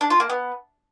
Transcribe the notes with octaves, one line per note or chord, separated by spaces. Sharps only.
D4
F4
A#3
B3